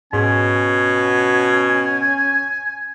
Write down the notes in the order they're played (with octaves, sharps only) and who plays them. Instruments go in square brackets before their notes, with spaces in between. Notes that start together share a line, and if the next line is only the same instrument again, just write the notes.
[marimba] G#2 [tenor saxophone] B2 [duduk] C#4 [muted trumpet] G#5